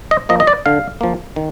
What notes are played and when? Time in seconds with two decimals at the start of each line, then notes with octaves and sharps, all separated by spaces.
0.11 D#5
0.29 F3 A#3 D#5
0.40 D#5
0.47 D5
0.66 D3 F5
1.01 F3 A#3
1.36 D#3